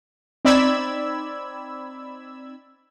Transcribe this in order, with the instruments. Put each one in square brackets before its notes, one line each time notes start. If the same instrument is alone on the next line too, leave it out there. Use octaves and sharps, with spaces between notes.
[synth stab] C4 D#4 D5 B5 E6 G#6